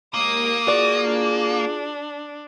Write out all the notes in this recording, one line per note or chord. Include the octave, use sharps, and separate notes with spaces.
D#2 G#3 A#3 A#4 D#6
F4 F#4 G#4 D5
D4